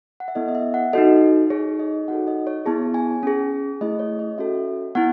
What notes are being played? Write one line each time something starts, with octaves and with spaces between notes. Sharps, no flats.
F#5
E5
B3 E4 A4 D#5
D#5
E5
F#5
D#4 F#4 A4 D#5
D#4 G#4 C#5
D#5
D#4 F#4 A4 F#5
D#5
C#5
B3 E4 G#4 A5
G#5
C#4 G#4
A3 E4 G#4 D#5
C#5
D#5
C#4 F#4 A4 E5
B3 E4 F#5